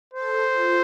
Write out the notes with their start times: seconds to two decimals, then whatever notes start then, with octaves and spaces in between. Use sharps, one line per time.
0.14 A4 C5
0.53 F4